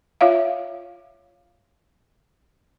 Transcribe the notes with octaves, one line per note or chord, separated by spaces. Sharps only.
F4 C#5 E5 F5